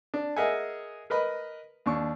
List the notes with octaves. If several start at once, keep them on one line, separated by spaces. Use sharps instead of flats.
D4
G#4 A#4 D#5 E5 F#5 G#5
A#4 B4 D#5 B5
D#2 D4 C#6